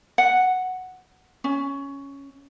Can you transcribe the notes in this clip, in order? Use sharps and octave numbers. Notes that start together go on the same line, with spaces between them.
F#5
C#4